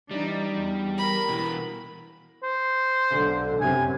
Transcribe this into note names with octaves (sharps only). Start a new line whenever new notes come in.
E3 G3 D4 D#4
E2
A#4 B5
B2 E3
C5
B1 D3
F#2 C3 G#5